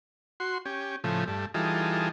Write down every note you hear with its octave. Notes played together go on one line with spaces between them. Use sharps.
F#4 C6
C#4 G4
A2 C#3 F3 A3
G2 A3
E3 G3 D#4 F4 G#4 A4